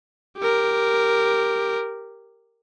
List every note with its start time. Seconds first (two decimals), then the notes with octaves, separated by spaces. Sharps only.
0.39 G4 A#4